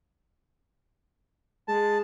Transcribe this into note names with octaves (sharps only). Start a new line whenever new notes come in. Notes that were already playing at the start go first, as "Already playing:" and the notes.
G#3 A5